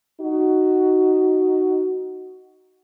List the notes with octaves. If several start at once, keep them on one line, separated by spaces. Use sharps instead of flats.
D#4 F#4